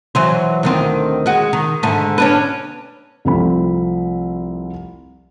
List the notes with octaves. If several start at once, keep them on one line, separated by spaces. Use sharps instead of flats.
E3 F#3 C5
D2 D#3 C4
G#3 F#4
D#3
G#2 D3 A3
C#4 D4 B4
C2 F3 A3 C4 F4 B5